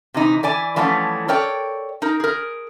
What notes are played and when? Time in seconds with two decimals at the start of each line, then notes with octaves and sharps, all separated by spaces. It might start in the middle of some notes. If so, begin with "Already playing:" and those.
0.14 C3 E3 D#4
0.43 E3 D5 G#5
0.76 E3 F3 G3 A3 B3 C#4
1.28 A4 A#4 C#5 D5 G5
2.02 D#4 A#4
2.20 G#4 A#4